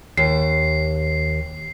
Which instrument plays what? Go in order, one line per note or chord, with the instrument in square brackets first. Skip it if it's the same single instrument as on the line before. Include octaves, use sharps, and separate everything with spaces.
[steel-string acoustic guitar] D#2 [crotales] C7